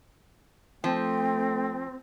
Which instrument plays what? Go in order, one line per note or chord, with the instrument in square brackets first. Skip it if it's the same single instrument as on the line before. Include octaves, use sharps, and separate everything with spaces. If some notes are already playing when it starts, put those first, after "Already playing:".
[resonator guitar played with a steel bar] F3 [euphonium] A3 [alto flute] C4 [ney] G5